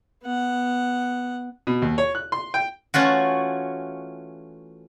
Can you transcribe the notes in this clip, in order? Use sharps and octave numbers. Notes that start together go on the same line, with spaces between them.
B3 F#5
B2
D#2
C#5
F#6
C6
G5
E3 A3 C#4 F4 F#4